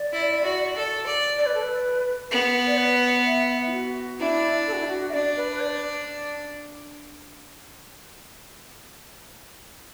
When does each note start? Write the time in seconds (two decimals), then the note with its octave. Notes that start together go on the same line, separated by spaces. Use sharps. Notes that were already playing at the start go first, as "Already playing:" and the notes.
Already playing: D5
0.12 E4
0.43 F#4
0.76 A4
1.06 D5
1.38 D5
1.46 B4
1.54 A4
1.63 B4
2.31 B3
2.67 D5
2.79 B4
3.25 E5
3.67 E4
3.72 F#4
4.19 D4 E4
4.67 A4
4.73 F#4
4.81 E4
4.88 F#4
5.09 E5
5.13 D4 D5
5.36 B4
5.52 B4
5.61 D5